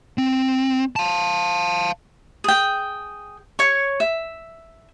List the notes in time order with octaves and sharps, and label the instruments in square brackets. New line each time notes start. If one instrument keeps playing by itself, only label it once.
[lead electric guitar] C4
F5 A5
[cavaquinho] G#4 G5
C#5 C#6
E5